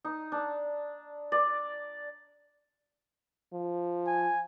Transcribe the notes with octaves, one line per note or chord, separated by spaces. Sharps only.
D#4
D4
D5
F3
G#5